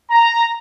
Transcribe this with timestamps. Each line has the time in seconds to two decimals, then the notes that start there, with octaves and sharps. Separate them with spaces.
0.11 A#5